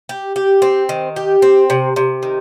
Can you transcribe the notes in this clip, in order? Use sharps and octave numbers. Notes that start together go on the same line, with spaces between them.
G4
G4
C4
D#3
G4
C4
C3
C3
D#3